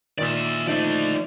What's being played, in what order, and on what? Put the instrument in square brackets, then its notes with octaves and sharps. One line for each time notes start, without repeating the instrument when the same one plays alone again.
[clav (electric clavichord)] A#2 D#3 [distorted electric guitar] D5 E5
[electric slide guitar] F3 D#4 [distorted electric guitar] A3 D5